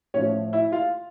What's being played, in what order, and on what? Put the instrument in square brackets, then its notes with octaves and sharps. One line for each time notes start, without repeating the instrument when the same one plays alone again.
[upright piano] A2 C#4 C#5
F3
E4 E5
F4 F5